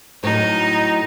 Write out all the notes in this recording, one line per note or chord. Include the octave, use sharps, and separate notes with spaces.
A2 F#3 D#4